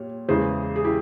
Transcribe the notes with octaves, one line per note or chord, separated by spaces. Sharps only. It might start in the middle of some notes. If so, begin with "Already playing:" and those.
Already playing: A#2 G3 C#5
E2 C#3 E3 G#3 G#4 C5
G#4
E4 G4